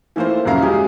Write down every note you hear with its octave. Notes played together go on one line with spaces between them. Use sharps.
E3 A3 A#3 F4 C5
D#1 F#2 C#3 E4 F5 A#5
F#3 G#3 G4 G#4